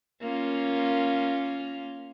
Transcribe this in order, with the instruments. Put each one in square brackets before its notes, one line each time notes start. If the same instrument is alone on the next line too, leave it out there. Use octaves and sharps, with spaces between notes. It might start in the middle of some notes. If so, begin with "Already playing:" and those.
[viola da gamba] A#3 C#4 F4